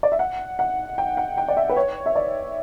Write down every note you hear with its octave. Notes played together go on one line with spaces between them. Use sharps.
D5
E5
F#5
F#5
G5
F#5
G5
D5
E5
B4
C#5
E5
D5